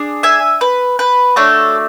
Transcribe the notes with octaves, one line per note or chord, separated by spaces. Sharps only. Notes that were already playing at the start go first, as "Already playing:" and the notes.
Already playing: D4 G#4
E5 G#5
B4
B4
A3 D4 F#4 A4 C#5